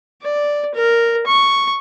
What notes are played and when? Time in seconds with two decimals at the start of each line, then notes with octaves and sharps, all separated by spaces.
0.22 D5
0.75 A#4
1.27 C#6